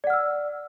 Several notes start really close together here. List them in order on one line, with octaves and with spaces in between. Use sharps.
D5 F#5 F6 E6